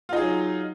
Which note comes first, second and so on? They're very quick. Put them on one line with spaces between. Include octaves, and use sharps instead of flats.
F4 D#4 G#4 F#3